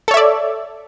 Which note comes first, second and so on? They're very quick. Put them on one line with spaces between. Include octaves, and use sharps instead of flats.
A4 C#5 E5 D5